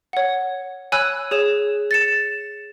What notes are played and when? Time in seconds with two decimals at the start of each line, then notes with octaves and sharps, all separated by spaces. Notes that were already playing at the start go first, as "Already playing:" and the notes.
0.13 C#5 F#5
0.92 C#5 G#5 B5 E6 F#6
1.31 G#4 C#5 E7
1.91 A6 C#7 E7